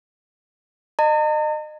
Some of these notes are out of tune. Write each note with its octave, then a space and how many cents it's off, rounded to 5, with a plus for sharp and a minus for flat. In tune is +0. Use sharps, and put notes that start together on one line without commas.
D#5 -30 A#5 -45